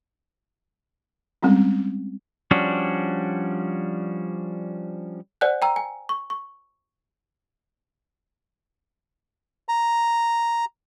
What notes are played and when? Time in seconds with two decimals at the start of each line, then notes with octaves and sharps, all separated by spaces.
1.43 G3 G#3 C4 C#4
2.51 F3 G3 C#4 D4 F#4
5.41 C5 D5 F#5 G#5 F#6
5.62 G5 A#5 E6
5.76 G#5
6.09 C#6
6.30 C#6
9.69 A#5